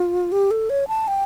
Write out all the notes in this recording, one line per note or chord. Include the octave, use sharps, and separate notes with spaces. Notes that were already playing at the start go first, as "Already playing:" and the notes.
Already playing: F4
G4
A4
C#5
A5
G5